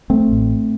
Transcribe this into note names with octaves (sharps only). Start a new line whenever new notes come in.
A3 C4
A1 A2